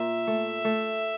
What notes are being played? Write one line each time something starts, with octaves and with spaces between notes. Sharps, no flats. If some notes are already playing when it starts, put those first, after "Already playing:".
Already playing: A#2 E5
A3
A3